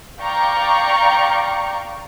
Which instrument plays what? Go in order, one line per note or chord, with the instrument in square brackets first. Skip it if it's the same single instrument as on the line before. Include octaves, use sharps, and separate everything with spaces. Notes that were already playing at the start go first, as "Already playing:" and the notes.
[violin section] D5 F5 G5 A#5 C#6